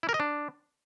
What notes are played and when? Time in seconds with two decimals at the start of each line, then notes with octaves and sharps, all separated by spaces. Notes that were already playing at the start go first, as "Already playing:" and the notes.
0.03 E4
0.09 A#4
0.14 D#5
0.20 D4